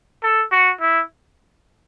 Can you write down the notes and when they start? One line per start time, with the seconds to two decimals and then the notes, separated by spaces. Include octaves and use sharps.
0.23 A4
0.52 F#4
0.81 E4